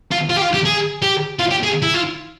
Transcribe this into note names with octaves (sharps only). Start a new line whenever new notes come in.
F4
F4
G4
F4
G4
G#4
G4
F4
G4
G#4
E4
F4